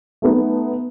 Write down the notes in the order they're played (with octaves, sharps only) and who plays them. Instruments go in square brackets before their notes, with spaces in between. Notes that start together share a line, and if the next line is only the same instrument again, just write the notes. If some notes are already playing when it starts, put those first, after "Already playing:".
[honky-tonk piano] A3 B3 D#4